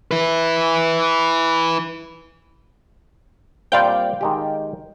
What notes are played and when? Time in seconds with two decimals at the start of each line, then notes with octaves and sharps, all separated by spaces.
0.11 E4 B4
3.72 A#2 G3 C4 D5 F5 G5
4.21 D#3 G#3 G4